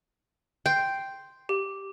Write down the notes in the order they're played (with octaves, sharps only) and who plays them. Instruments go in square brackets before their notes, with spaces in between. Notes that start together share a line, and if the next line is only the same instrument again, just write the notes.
[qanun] G5 C6 [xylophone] G6
[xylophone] G4